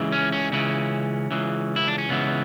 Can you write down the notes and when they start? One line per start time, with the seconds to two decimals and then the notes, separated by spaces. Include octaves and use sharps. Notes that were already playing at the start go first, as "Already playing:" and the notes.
Already playing: C#2 C#3 E3
0.12 C#4
0.32 C#4
0.52 C#2 C#3 E3 C#4
1.31 C#2 C#3 E3
1.76 E4
1.88 D4
1.98 C#4
2.09 C#2 C#3 E3 B3